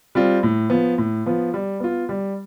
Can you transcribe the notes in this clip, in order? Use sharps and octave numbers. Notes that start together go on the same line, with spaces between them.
G3 C4 F4
A2
F3 B3
A2
F3 B3
G3
B3 F4
G3